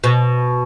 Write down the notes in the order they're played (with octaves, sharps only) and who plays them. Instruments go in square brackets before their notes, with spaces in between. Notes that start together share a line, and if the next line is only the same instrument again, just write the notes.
[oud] B2